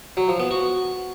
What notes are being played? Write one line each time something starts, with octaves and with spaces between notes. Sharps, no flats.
F#3
F3
B3
F#4